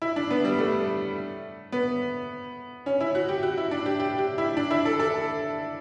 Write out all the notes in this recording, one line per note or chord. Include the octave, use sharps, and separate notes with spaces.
E4
D4
B3
G3
A3
B3
C#4
E4
F#4
G4
F#4
E4
D4
G4
G4
G4
E4
D4
E4
A4
A4